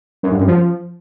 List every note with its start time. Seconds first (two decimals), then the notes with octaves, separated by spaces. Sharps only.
0.23 F#2
0.31 G2
0.40 F#2
0.48 F3